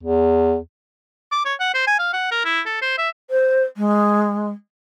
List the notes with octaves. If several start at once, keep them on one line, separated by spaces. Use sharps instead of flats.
E2
D6
C#5
F#5
C5
G#5
F5
F#5
A#4
E4
A4
C5
E5
C5
G#3